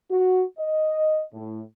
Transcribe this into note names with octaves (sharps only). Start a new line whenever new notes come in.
F#4
D#5
A2